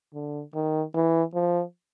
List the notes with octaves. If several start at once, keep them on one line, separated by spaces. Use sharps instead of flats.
D3
D#3
E3
F3